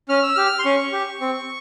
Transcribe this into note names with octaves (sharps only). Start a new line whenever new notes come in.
C#4 F6
E6
G4 F6
C6
C#4 C#6
G4
C4